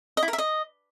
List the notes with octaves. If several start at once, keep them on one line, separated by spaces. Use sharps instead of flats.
D#5
E4
A#4
E5
D#5